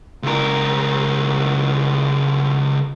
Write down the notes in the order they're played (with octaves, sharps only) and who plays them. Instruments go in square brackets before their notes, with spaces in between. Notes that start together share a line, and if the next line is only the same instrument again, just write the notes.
[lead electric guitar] C#2 A#4